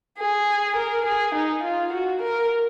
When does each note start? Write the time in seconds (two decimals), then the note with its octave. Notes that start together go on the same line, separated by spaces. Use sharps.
0.19 G#4
0.76 A#4
1.06 G#4
1.35 D#4
1.63 F4
1.92 F#4
2.21 A#4